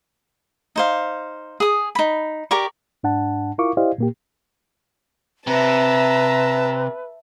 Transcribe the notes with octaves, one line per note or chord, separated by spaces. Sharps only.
D#4 C5 F5
G#4 D#6
D#4 B5
G4 A#4 D5 C#6
G#2 D4 F#5 A5
E4 F4 A#4 F5 C#6 D6
E4 G4 C5 D5 D#5 F5
A#2 A#3 G4
C3 B4 E5 A5 A#5